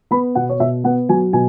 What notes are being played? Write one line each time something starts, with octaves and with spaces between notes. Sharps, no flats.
B3 B5
B2 F#5
C#5
B2 E5
B3 F#5
F#3 G#5
B2 G#5